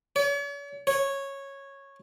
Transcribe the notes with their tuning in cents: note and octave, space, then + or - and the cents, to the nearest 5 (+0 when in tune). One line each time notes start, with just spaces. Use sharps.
C#5 +45
C#5 -10